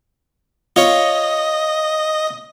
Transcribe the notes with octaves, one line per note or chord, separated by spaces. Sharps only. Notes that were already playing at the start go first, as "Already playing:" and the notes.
F4 C#5 D#5